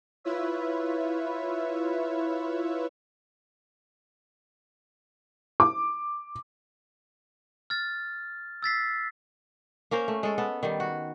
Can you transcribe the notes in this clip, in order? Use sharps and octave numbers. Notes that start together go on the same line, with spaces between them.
E4 F4 B4 C#5 E5
D6
F6 A6
E6 A6 B6 C7
A#3 C#4 A#4 C5
A3
G#3 A4
B3 A4
D#3 G3
F#4